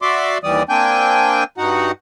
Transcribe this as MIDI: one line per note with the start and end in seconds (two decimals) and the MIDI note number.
0.02 0.38 66
0.02 0.38 74
0.02 0.38 76
0.02 0.38 84
0.02 0.38 86
0.44 0.63 39
0.44 0.63 52
0.44 0.63 55
0.44 0.63 74
0.44 0.63 87
0.69 1.44 58
0.69 1.44 60
0.69 1.44 62
0.69 1.44 79
0.69 1.44 80
0.69 1.44 91
1.58 1.91 43
1.58 1.91 63
1.58 1.91 66
1.58 1.91 78